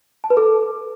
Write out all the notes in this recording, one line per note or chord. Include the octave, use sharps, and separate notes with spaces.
A5
B4
A4